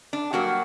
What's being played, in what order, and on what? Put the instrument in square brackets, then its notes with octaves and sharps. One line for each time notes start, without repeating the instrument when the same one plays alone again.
[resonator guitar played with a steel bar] D4
G2 F#3 A#3 F#4